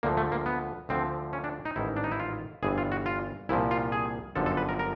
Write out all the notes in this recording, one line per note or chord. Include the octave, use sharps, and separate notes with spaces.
D2 D3 F3 A#3
A3
A#3
B3
D2 D3 F3 C4
C#4
D4
D#4
A1 G#2 D#3 E4
D4
D#4
E4
F4
G1 G2 E3 G#4
F4
F#4
F4
C2 A#2 F3 E4
F4
G#4
G1 F#2 D3 F3 A4
A4
B4
A#4
A#4